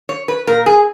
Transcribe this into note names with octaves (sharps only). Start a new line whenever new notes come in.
C#5
B4
A#2 A#4
G#4